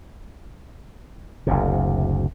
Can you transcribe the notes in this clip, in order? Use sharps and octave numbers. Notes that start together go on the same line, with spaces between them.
F#1 D2 C3